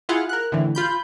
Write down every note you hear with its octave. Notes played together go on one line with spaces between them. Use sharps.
E4 F4 G#4 F5 F#5
A#4 F#6
A2 D3 E3
F4 B5 G6